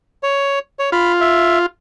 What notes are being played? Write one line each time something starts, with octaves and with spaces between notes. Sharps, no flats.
C#5
C#5
F4 B5
E5